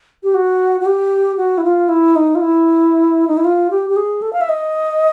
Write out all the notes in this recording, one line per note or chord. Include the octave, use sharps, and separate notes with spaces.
G4
F#4
F#4
G4
F#4
E4
F4
E4
D#4
F4
E4
D#4
E4
F4
G4
G4
G#4
A4
F5
E5
D#5